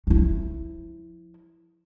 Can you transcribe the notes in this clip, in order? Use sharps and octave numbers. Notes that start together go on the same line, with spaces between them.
F3 E4